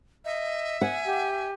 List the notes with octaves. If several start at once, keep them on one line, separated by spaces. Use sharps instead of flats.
D#5 E5
F#5 G#5
G4